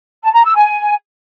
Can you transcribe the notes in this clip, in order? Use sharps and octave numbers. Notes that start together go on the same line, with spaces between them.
A5
A#5
E6
G#5